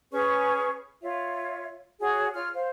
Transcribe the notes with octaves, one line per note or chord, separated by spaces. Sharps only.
C#4 G#4 B4 C#6
F4 C#5 E5
F#4 G#4 C#5
F4 C#5 F6
C5 F5